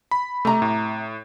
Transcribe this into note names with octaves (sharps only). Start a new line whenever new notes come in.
B5
C3 A3 A#5
A2